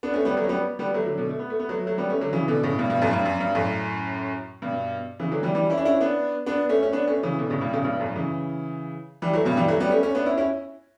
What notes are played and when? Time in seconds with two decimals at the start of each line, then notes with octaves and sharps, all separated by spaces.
0.03 B3 D4
0.14 A3 C#4
0.25 G3 B3
0.37 F#3 A3
0.44 C#4
0.49 G3 B3
0.79 G3 B3
0.94 F#3 A3
1.06 D3 F#3
1.17 B2 D3
1.29 A3
1.39 B3
1.50 A3
1.60 B3
1.69 F#3 A3
1.86 F#3 A3
1.98 G3 B3
2.09 A3 C#4
2.21 D3 F#3
2.33 C#3 E3
2.48 B2 D3
2.63 A2 C#3
2.78 G2 B2
2.90 G2 B2
3.01 F#2 A2
3.13 G2
3.25 F#2
3.40 G2
3.55 F#2 A2
4.62 G2 B2
5.20 C#3 E3
5.31 D3 F#3
5.43 E3 G3
5.54 E3 G3
5.70 C#4 E4
5.77 D4
5.85 C#4 E4
6.01 B3 D4
6.46 B3 D4
6.69 A3 C#4
6.83 C#4
6.93 B3 D4
7.08 A3 C#4
7.23 C#3 E3
7.39 B2 D3
7.50 A2 C#3
7.61 G2 B2
7.73 A2 C#3
7.85 G2 B2
8.00 F#2 A2
8.16 C#3 E3
9.22 E3 G3
9.34 F#3 A3
9.45 G2 B2
9.57 E3 G3
9.68 F#3 A3
9.80 G3 B3
9.91 A3 C#4
10.03 A3 C#4
10.15 B3 D4
10.26 C#4 E4
10.37 C#4 E4